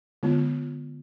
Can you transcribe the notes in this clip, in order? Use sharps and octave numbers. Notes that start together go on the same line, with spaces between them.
D3 G#3 B3 F4